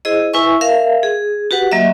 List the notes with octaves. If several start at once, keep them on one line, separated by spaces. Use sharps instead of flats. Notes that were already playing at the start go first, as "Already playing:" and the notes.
E4 G#4 C5 D#5
E4 B4 E5 G#5 C#6
A#4 E5 F5
G#4
F#4 G4 B4 F#5
F#3 A#3 D#5 E5